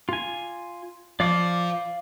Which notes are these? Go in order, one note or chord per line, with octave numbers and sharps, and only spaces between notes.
F4 G#5
F3 D5 F5 D6